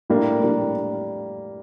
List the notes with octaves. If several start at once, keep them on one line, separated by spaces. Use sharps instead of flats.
A2 G3 A#3 D4
A2 G3 A#3 D4